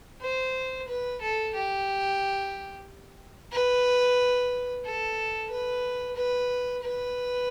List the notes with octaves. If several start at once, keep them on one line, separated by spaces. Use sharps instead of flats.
C5
B4
A4
G4
B4
A4
B4
B4
B4